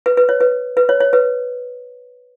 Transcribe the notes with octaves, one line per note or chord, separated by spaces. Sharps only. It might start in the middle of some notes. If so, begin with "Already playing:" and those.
B4
B4
C#5
B4
B4
C#5
C#5
B4